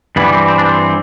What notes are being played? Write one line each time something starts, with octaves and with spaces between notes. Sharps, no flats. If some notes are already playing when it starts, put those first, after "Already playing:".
G2 E3 G3 B3
C4
C4
D4
C4